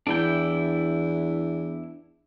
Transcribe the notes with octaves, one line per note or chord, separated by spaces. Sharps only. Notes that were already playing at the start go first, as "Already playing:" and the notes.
E2 D4 E4 G5